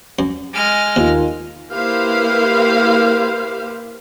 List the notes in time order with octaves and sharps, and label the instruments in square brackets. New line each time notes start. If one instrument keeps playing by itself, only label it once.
[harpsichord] F#2
[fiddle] G#3 F6
[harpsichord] D#2 [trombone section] D#3 D#4 F4
[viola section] A#3 E4 G4 B4 C5 F5